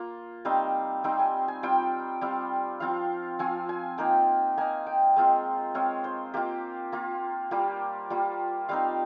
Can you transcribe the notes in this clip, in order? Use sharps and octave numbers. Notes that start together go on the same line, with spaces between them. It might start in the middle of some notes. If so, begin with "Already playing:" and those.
Already playing: A#3 F4
G3 C4 D#4 F5
G3 C4 D#4 G5
G#5
G#5
G3 C4 F4 G5
G3 C4 F4
F3 C4 F4 F5
F3 C4 F4 G#5
G#5
A#3 D#4 G5
A#3 D#4 G#5
G5
G#3 C4 F4
G#3 C4 F4 C#5
C5
A#3 F4 G4
A#3 F4
G3 A#3 F4 G4
G3 A#3 F4
G3 C4 D#4 F5